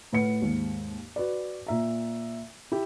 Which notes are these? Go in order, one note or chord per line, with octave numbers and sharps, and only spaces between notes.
A2 B4 F#5 C#7
D#2 G#2
F#4 B4 D5
A#2 E5 A#5
E4 G4